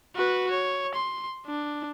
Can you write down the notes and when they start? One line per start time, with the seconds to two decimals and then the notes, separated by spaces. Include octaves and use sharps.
0.16 F#4 B4
0.51 C#5
0.95 C6
1.46 D4